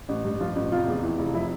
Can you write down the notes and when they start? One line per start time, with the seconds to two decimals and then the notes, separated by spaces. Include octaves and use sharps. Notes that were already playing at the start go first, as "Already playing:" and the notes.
0.09 A1
0.24 G2
0.40 F3 F4
0.56 A1
0.72 F1 F4
0.88 E2
1.03 E3
1.19 F1
1.34 F3 E4